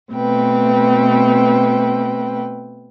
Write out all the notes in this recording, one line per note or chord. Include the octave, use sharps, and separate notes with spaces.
B2 A3 C4 B4 G5